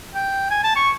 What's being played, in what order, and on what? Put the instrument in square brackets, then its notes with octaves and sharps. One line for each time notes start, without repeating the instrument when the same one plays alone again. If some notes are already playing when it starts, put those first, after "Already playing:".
[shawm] G5
G#5
A5
C#6